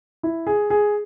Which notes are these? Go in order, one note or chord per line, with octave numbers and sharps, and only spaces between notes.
E4
G#4
G#4